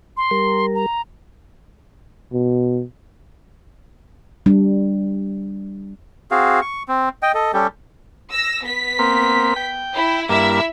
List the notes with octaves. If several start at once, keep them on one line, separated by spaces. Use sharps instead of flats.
C6
G3 A#4
A#5
B2
G3 D4
C4 F#4 G#4 F5
C#6
C4
D#5 G5
A4 D#5
G3 C#4 G4 A4
E6 A#6
B3 B6
A#3 C4
G5
E4
G2 A#3 E4 E5